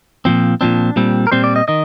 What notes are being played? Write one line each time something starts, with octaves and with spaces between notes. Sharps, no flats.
A#2 F3 C4
A#2 F3 C4 D4
A#2 G3 C4
A#4
A#2 G3 C4 C5
D5
D#5
D#3 D#5